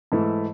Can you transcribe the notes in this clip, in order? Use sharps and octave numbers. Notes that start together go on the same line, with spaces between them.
G#2 E3 A3 E4